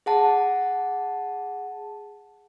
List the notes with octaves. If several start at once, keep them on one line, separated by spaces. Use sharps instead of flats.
G#4 F#5 A5